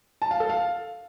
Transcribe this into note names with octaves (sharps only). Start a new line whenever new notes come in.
A5
F5
A4
F5